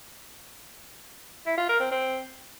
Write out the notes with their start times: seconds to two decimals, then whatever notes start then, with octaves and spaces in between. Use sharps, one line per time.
1.46 E4
1.58 F4
1.69 A#4
1.80 C4
1.91 C4